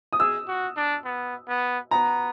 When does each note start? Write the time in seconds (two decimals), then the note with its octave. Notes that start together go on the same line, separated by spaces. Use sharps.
0.13 D#6
0.20 G#4 E6
0.48 F#4
0.77 D4
1.05 B3
1.48 B3
1.91 B3 A#5